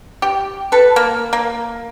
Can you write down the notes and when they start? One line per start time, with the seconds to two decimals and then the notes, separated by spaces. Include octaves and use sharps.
0.22 G4
0.72 A4 B4
0.96 A#3
1.33 A#3